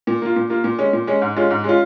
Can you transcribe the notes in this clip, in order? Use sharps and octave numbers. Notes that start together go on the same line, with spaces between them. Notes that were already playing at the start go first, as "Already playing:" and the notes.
A#2
A#3 F4
A#2
A#3 F4
A#2
G#3 C#4
A#2
G#3 C#4
G#2
G#3 C#4 F4
G#2
G#3 C#4 F4